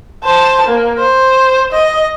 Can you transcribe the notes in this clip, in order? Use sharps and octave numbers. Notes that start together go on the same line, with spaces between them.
C5 A5
A#3
C5
D#5